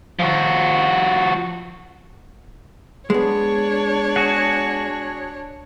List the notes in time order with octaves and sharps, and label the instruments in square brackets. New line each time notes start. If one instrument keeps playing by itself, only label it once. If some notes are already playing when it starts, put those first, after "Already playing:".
[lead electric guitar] F3 F#4
[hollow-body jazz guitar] G#3 B3 [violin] D4 C#5
[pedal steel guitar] F#4 G#4 F#5